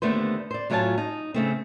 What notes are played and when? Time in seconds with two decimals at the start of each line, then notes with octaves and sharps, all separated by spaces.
0.02 D#2 D3 A3 B3 C5
0.51 C5 D5
0.70 A2 F#3 F4 C#5 G#5 A5
0.98 D#4
1.34 C#3 A3 C4